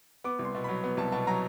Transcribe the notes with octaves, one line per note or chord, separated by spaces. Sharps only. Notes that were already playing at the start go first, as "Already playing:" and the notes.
B3 D6
C2
C6
B2
F#3 B5
B3
C2 A5
B2 A5
F#3 A#5